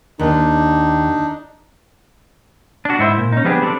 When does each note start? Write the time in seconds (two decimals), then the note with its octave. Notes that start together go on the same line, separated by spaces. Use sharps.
0.19 D#2 D4 D#4
2.85 D4 F#4
2.99 G#2 E4 C5 E5
3.18 A#2
3.32 C#4 D#4
3.44 F3 G3 B3 D4 G4 G#4
3.62 G3 C4 D4 A4